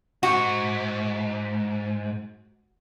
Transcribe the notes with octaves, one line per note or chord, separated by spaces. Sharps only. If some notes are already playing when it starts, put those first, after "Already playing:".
G#2 F#4